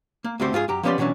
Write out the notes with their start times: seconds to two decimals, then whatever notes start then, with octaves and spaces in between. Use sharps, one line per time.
0.24 A#3
0.40 D2 A3 C4 F#4 G4 C5
0.53 G#2 F4 G4 G#4
0.68 F#2 G4 A#5
0.83 F3 B3 C#4 G4 D5 C6
0.98 B2 E3 F#3 C#4 D4